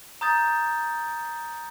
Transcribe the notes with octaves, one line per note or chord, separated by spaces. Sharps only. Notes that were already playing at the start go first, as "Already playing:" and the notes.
A#5 D#6 G6 A6